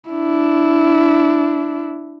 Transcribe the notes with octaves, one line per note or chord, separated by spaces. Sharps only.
D4 E4